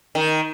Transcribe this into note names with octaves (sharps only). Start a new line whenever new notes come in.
D#3